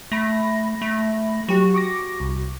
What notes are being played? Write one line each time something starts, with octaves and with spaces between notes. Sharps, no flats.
A3 B5 A#6
A3
F#3 F#4 G4
C#6 D6 A#6
C2